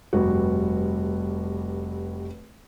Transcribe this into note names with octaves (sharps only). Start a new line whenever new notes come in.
F1 G2 G3 F#4